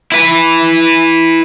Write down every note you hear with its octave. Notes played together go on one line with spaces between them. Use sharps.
E4 B4